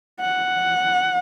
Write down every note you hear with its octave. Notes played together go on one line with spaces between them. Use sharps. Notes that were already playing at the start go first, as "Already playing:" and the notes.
F#5